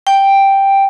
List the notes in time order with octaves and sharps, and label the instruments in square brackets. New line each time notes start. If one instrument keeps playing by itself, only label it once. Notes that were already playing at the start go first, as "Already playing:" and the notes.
[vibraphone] G5